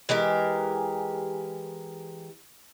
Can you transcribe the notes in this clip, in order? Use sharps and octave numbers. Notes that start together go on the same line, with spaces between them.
E3 G#3 G4 A#4